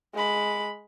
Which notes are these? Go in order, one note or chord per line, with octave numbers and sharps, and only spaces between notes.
G#3 B5